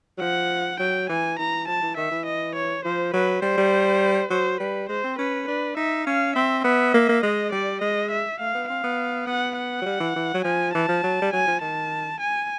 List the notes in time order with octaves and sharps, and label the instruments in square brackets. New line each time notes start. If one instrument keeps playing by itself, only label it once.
[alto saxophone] F#3
[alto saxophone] F3 [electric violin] F#5
[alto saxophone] F#3 [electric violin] G5
[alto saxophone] E3 [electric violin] G#5
[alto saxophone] E3 [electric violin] A#5
[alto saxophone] F3 [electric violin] A5
[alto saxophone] E3
[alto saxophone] D#3 [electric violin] E5
[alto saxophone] E3
[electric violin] D#5
C#5
[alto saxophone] F3 [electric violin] C5
[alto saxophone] F#3 [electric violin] B4
[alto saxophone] G3 [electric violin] C5
[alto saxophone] G3
[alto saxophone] F#3 [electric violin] C5
[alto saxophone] G3 [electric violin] B4
[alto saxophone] G#3 [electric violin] C5
[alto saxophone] C4
[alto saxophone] C#4 [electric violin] B4
[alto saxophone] D4 [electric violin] B4
[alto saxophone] D#4 [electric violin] E5
[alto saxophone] C#4 [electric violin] F5
[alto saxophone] C4 [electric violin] E5
[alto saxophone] B3 [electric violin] E5
[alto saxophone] A#3
A#3
[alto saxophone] G#3 [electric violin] D#5
[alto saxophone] G3 [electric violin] D5
[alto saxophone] G#3 [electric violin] D#5
[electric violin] E5
[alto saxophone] A3 [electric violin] F5
[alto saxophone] B3
[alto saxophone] C4 [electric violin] F5
[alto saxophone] B3
[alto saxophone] B3 [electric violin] F#5
[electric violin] F#5
[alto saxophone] F#3
G3
E3
E3
F#3
[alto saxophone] F3 [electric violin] G#5
[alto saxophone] E3 [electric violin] A5
[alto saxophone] F3
F#3
G3
[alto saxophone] F#3 [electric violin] G#5
[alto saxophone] F3
[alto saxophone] D#3 [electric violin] A5
[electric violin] G#5